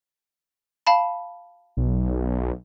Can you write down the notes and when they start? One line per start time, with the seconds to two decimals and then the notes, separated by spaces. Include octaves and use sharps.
0.87 F5 A5 B5
1.77 B1